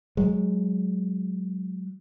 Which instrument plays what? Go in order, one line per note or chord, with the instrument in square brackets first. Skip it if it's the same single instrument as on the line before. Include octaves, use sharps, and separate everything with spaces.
[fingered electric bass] F#3 G#3